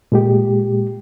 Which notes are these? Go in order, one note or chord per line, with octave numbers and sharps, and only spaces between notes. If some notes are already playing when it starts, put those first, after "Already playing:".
A#2 G#3 G4